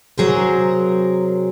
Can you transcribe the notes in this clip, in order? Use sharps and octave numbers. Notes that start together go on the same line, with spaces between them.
C3 F#3 G#4 A#4 C5